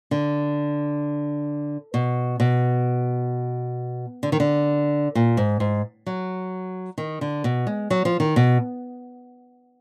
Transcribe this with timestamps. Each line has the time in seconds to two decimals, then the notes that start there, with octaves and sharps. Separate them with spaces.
0.11 D3
1.94 B2
2.40 B2
4.23 D3
4.32 D#3
4.40 D3
5.15 A#2
5.37 G#2
5.60 G#2
6.06 F#3
6.98 D#3
7.21 D3
7.44 B2
7.67 G#3
7.90 F#3
8.05 F3
8.20 D#3
8.36 B2